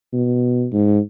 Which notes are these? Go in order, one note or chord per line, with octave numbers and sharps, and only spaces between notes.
B2
G#2